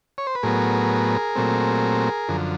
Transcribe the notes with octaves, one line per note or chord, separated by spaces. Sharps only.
C#5
C5
B4
A2 F#3 B3 G#4 A#4
A#2 F#3 A3 C4
F#2 D3 F3